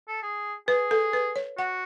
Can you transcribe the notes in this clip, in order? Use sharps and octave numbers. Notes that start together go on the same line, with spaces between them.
A4
G#4
G#4 B4
A4
B4
C#5
F#4 F#5